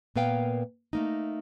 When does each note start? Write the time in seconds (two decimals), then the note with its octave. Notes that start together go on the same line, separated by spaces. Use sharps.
0.16 A#2 A#3 B3 B4 F5 G5
0.93 A3 A#3 D#4